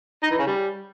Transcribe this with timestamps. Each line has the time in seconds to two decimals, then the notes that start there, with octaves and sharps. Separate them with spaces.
0.23 D#4
0.31 E3
0.39 C#3
0.47 G3